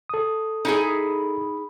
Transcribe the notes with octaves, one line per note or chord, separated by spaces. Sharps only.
A4 D#6
D#4 E4 G#4